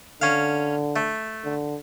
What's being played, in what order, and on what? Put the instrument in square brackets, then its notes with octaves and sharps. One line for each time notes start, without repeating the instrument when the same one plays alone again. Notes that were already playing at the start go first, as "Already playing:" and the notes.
[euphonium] D3 [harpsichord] C#4 F5
[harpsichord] A3
[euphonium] D3